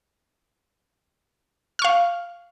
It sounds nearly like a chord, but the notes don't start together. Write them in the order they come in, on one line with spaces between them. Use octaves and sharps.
F6 C#6 F5